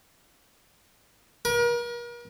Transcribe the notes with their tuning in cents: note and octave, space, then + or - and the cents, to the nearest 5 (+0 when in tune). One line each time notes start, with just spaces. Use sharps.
A#4 +40